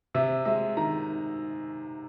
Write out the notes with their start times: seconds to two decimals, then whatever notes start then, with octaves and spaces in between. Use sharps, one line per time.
0.15 C3 E5
0.45 G#3 E5
0.77 D#3 A#5